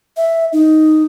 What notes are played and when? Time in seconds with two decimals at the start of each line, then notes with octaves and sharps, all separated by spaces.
0.17 E5
0.53 D#4